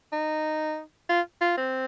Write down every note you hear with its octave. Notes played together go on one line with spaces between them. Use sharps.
D#4
F4
F4
C4